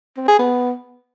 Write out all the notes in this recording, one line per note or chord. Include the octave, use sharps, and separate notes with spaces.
C4
G#4
B3